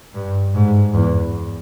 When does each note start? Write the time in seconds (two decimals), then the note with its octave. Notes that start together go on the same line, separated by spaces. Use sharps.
0.14 G2
0.54 G#2
0.93 E2